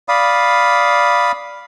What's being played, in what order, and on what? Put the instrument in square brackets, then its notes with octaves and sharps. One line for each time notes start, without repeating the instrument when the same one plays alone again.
[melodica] D5 F5 B5 D#6